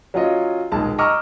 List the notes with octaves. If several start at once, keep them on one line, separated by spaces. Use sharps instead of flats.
F#3 C#4 F4 D#5
D#1 B1 G#3 A5
D#5 A#5 C#6 D6 E6 F6